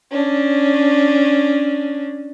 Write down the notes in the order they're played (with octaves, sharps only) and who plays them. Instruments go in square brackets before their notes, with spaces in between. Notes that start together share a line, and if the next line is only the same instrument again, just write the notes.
[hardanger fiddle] C#4 D4